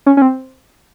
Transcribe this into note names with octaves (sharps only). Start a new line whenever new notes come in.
C#4
C#4
C4